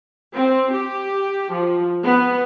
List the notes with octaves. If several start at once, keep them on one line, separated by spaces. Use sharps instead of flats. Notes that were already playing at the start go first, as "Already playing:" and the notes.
C4
G4
F3
B3